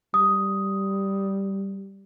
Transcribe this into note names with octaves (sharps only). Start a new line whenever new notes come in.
G3 D#6